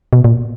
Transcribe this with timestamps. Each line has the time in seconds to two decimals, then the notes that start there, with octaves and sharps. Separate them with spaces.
0.13 B2
0.24 A#2